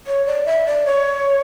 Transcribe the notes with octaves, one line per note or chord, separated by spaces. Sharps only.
C#5
D5
E5
D5
C#5